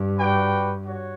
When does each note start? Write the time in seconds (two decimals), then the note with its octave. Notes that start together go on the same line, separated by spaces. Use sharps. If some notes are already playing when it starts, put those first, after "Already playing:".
Already playing: G2
0.17 F#4 B4 D5 G5
0.84 F#4 C#5